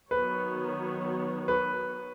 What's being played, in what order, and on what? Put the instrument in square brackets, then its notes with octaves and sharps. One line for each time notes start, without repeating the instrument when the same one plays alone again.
[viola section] D#3 F#3 B3 F#4 C#5 [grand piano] B4
[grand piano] B4